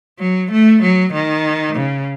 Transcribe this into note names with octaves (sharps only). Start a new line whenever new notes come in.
F#3
A3
F#3
D#3
C#3